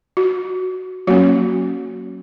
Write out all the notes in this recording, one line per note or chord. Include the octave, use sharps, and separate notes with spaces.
F#4
F#3 A#3 C#4 F#4